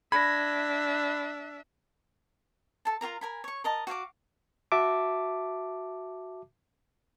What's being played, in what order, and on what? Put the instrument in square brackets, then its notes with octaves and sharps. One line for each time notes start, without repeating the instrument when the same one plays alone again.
[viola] D4 E5 [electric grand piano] B5 [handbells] G#6 A#6
[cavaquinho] A4 A5
F4 F#4 A#4 A#5
A#4 G#5 B5
C#5 C#6
A#4 D#5 A5
F#4 F5 G#5 D6
[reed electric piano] F#4 E5 A5 D6